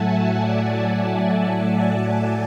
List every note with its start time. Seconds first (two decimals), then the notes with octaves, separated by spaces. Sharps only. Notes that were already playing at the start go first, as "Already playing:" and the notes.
Already playing: A2 F#3 A3 E5 F#5 G#5 A5
0.35 D5 F#5